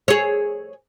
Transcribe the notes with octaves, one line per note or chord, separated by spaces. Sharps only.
G#4 C#5